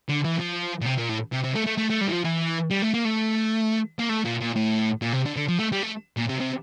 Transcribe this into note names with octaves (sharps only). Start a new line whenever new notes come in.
D3
E3
F3
A#2
C3
A#2
A2
C3
C3
A3
A3
A3
A3
G3
E3
F3
E3
G3
A3
A#3
A3
A#3
A3
A#2
A#2
A2
A#2
C3
D3
D3
F3
A3
G3
A3
A#2
C3
C3